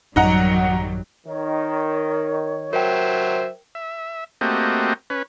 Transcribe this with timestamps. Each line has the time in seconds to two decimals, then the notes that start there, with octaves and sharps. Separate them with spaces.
0.16 A1 F#2 D#3 F#3 G3 D#4 F#5 A#5
1.27 D#3 C#5
2.73 F#3 A#4 C5 E5 G5
3.75 E5
4.41 A3 A#3 C4 F#4 G4 D#5
5.10 C#4 B4